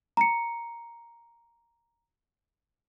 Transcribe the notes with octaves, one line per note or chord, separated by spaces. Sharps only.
A#5 C#7